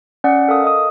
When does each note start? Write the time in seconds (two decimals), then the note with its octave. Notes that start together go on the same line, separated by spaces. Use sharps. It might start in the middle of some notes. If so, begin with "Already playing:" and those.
0.24 C#4 D5 F#5
0.48 A4 A#4 F5 D#6
0.64 D#5 D#6